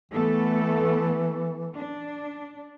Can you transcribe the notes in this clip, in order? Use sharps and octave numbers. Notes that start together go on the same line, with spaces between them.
E3 A3 B3 A4
D4